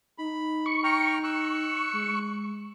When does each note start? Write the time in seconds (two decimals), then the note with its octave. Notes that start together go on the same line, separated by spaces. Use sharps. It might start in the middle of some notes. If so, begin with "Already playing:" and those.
0.18 D#4 B5
0.66 C#6
0.84 G5 A#5 F6
1.24 C#6 E6 F#6
1.93 G#3